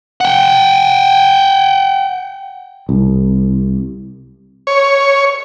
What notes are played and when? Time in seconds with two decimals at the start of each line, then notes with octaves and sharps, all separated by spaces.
0.21 F#5 G5
2.89 C2
4.67 C#5